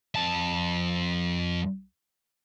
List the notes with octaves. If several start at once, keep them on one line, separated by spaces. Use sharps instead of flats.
F2 A5